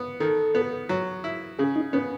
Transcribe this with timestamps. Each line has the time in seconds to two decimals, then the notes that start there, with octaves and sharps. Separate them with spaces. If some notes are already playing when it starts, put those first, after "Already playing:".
Already playing: B3
0.20 D#3 A4
0.55 B3
0.89 F#3
1.24 E4
1.59 C#3 G#4
1.76 D#4
1.93 B3 C#4